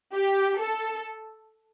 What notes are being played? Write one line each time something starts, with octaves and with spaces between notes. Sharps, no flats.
G4
A4